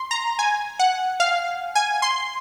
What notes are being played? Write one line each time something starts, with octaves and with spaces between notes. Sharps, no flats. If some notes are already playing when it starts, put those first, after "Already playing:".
Already playing: C6
A#5
G#5
F#5
F5
G#5
C6